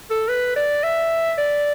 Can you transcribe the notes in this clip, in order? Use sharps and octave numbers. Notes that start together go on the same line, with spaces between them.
A4
B4
D5
E5
D5